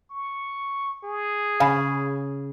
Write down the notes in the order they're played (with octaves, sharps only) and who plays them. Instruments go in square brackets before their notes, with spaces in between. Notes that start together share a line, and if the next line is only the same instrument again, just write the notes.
[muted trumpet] C#6
G#4
[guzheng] C#3 [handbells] F5 G#5 B5